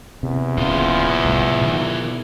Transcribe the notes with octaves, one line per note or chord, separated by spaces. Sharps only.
E2 C3
D1 A#2 C#3 E3 F4
C2 A2
B2 D#3